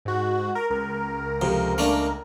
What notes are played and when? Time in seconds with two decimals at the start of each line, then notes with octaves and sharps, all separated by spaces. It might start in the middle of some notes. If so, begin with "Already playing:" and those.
0.05 G#2 F#4
0.55 A#4
0.70 C#2 A#4
1.41 F2 C3
1.78 A3 A#3 D4